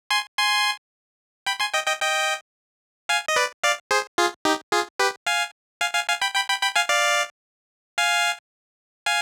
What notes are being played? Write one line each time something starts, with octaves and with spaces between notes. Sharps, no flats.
G#5 C6
G#5 C6
G5 B5
G#5 C6
D#5 G5
D#5 G5
D#5 G5
F5 G#5
D#5
B4 D5
D5 F5
G#4 C5
F4 G#4
D#4 G4
F4 G#4
G4 B4
F5 G#5
F5 G#5
F5 G#5
F5 G#5
G5 B5
G5 B5
G5 B5
G5 B5
F5 G#5
D5 F5
F5 G#5
F5 G#5